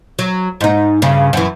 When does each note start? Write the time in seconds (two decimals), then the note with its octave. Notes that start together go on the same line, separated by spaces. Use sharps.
0.19 F#3
0.61 G#2 D#4
1.02 G2 C#3
1.33 F#2 E3